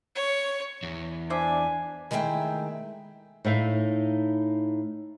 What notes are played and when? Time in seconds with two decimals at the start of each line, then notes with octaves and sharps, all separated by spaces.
0.15 C#5
0.83 E2
1.30 D4 C5 D5 E5 G#5
2.11 D#3 G#3 A3 E4 G5 A#5
3.44 A2 D#4 E5 F5